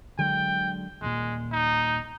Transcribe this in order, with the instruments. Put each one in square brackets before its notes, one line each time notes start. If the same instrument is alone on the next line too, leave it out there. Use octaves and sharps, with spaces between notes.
[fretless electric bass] D3 F#3 G#3 [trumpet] G5
[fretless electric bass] D#1 A#2 [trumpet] G#3
[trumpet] D#4